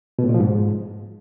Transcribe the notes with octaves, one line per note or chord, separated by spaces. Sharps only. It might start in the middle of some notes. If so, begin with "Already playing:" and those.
B2
A2
A#2
F3
G#2